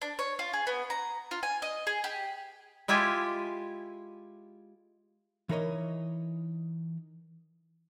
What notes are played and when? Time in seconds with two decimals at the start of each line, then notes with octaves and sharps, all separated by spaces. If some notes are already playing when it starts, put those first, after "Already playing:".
0.02 D4
0.19 C#5
0.39 F4
0.53 G#4
0.67 B3
0.90 A#5
1.31 F4
1.43 G#5
1.62 D#5
1.87 G#4
2.04 G4
2.88 G#3 E4 F4 G4 G#5
5.49 E3 D#4 A#4 C#5 D#5